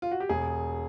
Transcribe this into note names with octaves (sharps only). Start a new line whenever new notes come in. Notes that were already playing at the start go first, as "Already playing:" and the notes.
F4
F#4
G4
E1 G#4